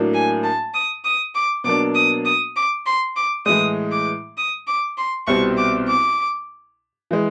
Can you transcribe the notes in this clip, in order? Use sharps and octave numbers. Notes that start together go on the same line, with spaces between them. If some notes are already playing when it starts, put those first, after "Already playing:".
Already playing: A2 F#3 A#3 D4
G#5
A5
D#6
D#6
D6
B2 F#3 A#3 D4 D6
D#6
D#6
D6
C6
D6
A2 E3 G#3 D#6
D6
D#6
D6
C6
C2 B2 G3 C4 C#6
D6
D6
E3 G#3